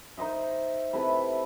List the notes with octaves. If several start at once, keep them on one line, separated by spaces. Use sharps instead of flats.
D#4 C5 D#5 E5
C3 E4 A4 B4